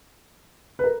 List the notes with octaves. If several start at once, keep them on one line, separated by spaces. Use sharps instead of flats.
B4
A#4